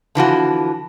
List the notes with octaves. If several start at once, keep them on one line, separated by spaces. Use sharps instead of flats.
D3 E3 F3 F#4